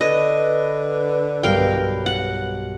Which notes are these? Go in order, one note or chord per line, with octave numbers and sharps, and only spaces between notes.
D3 B4 D#5 F#6 G#6 A6
B1 G2 A#4 F5 G5 A#6
F#5